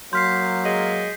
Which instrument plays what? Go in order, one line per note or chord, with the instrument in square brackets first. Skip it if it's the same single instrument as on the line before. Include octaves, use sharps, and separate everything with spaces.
[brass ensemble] F#3 A#3 [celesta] C6 F6 [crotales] G6 B6 C7
[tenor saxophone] G#3